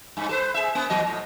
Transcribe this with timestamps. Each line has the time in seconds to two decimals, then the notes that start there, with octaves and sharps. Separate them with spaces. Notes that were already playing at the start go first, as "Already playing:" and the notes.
0.17 G2
0.29 A4 B4 C5
0.54 G#4 E5
0.75 A#3
0.90 E2 F3 D#5
1.07 A2